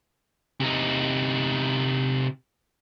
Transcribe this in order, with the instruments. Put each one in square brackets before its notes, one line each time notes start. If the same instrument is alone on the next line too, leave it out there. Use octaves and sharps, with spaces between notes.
[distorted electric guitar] C3 D#4